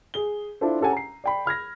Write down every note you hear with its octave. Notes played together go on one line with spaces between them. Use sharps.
G#4 G7
D4 E4 F4 A4 C5
C#4 G4 A4 F#5 G#5
A#5 C7
D5 G5 B5
B5 F6 G#6 A#6